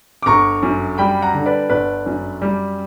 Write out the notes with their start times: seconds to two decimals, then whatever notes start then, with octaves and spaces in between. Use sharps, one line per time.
0.23 D6
0.26 G1 A#5 C#6
0.62 F#2
0.98 G3 G5 B5
1.22 F#5 A#5
1.34 D3
1.46 B4 D5
1.70 G1 B4 D5
2.06 F#2
2.42 G3